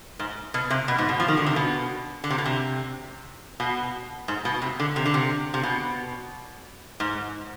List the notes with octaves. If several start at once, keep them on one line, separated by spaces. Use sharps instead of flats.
G#2
B2
C3
B2
G#2
B2
F3
D#3
D3
C3
B2
D3
C3
B2
C3
B2
G#2
B2
C3
D3
C3
D3
C3
C3
B2
G#2